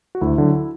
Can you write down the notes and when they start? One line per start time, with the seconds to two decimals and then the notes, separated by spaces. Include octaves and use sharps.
0.15 F#4
0.21 D2 E4
0.38 D3 F#3